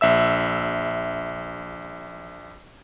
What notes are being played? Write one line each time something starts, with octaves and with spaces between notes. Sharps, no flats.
A#1 E5 E6